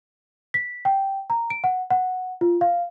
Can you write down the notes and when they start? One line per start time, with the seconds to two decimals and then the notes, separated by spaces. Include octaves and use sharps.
0.54 B6
0.85 G5
1.30 A#5
1.50 D7
1.64 F#5
1.91 F#5
2.41 F4
2.61 F5